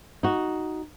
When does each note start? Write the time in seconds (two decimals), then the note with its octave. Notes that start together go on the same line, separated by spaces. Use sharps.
0.23 D#4 F#4